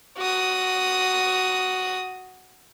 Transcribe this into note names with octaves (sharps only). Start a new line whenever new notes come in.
F#4 D#6